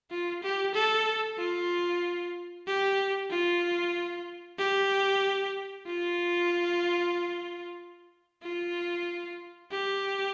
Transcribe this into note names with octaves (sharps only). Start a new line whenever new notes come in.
F4
G4
A4
F4
G4
F4
G4
F4
F4
G4